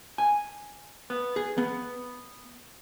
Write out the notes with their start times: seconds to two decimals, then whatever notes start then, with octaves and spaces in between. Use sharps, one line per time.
0.18 G#5
1.10 B3
1.36 G#4
1.58 B3